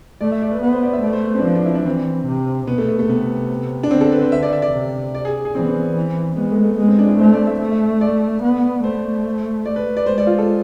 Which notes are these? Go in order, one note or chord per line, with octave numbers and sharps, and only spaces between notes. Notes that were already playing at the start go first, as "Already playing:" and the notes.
A3 D5
E5
D5
B4
B3 B4
C5
D5
E5
A3 D5
C5
B4
C4
D4
F3 C4
D4
E4
D4
E3 C4
C3
B2 B3
A3
A3
A3
C3 B3
D4
D3 C4
A4
B4
C5
E5
D5
E5
D5
C3
D5
G#4
G#4
E3 C4
B3
C4
E3
G#3 B3
A3
A3
G#3 B3
C4
D4
E4
A3 C5
D5
E5
A3
E5
D5
B3
A3 C5
D5
B4
D5
G#3 C5
D5
F4
A4